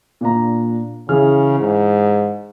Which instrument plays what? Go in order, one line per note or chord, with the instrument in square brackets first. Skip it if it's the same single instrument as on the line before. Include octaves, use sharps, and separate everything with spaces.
[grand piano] A#2 D4 A#5
[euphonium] C#3 [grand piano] E3 G#4 F6
[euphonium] G#2